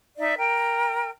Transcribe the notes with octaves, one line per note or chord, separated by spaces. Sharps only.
D#4 D5 E5
A#4 G5